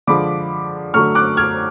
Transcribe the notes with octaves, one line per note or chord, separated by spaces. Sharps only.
D3 F3 G#3 B5 D6
D3 F#3 A3 C#6 F6
D6 F#6
F6 G#6